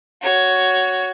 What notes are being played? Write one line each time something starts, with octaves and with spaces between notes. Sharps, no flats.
F#4 C#5